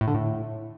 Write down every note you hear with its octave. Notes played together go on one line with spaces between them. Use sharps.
A2
D3
A2